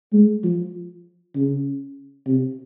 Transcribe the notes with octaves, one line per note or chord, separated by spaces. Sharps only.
G#3
F3
C#3
C3